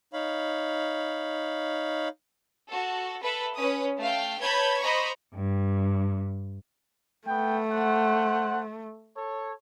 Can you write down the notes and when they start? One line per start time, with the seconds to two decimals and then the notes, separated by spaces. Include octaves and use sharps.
0.13 D#4 C#5 F5 B5
2.69 F#4 A4
3.23 A4 B4 E5
3.55 C#4 B4 D#6
4.00 A3 F5 G5
4.40 B4 C#5 A5 B5 G6 G#6
4.81 C5 D#5 A#5 B5 C#6
5.34 G2
7.28 A3 B3 G5
7.72 C5 F#5
9.17 A4 C#5